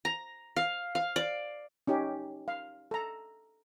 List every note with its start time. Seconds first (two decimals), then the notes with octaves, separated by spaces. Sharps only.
0.05 A#5
0.56 F5
0.95 F5
1.16 D5
1.87 C#4 D#4 G4
2.48 F5
2.91 A4 A#5